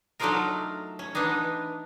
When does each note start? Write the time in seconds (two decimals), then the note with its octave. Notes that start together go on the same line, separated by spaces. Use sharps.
0.20 F#3 A3 D4 D#4 F4 A#4
0.99 C#4
1.15 E3 B3 D4 D#4